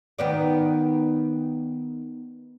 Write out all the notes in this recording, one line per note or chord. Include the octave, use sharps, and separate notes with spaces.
D#3 B3 D5